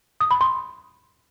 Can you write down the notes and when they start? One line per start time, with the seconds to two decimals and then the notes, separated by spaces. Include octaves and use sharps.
0.21 D#6
0.31 B5
0.41 C6